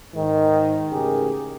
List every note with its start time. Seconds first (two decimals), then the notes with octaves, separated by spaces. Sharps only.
0.15 G#2 D#3
0.91 A1 G#2 C#3 G4 G#4 A#4